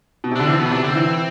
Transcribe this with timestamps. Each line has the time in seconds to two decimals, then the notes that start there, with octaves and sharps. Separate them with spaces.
0.24 B2
0.32 C3
0.36 D3 D4
0.47 E3 C4
0.59 B2 B3
0.71 C3 D4
0.84 D3 C4
0.95 E3